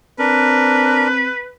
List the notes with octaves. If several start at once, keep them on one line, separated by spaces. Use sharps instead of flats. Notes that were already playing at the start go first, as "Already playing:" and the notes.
C4 D4 A#4 B4